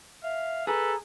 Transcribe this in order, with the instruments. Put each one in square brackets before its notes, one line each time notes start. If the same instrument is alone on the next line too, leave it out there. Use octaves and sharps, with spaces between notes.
[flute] E5 [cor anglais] F5
[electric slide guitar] G#4 [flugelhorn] A4 [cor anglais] B4 [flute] A#5